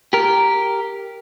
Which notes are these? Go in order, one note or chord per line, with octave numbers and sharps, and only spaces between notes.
G4 A#4